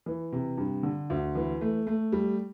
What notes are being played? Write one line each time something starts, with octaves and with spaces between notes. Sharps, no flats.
E3
C3
G2
D3
D2
E3
A3
A3
G3